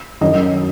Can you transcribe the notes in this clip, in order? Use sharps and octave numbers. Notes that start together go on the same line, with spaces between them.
F#2 D#3 F#3 D#5